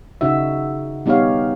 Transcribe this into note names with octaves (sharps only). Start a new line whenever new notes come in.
C#3 D#4 F#4 E5
G3 B3 D#4 G4 C#5 F5